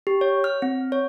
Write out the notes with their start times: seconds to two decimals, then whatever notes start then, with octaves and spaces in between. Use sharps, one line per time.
0.07 G4
0.21 C#5
0.44 F6
0.62 C4
0.92 C#5